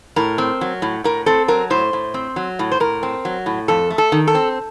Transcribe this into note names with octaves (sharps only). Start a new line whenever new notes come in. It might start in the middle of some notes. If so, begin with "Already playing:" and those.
A2 A#4
C4
F#3
A2
A2 A#4
C4 A4
F#3 A#4
A2 C5
A2
C4
F#3
A2
C5
A2 A#4
C4
F#3
A2
F2 A4
A3
A4
D#3
A4
C4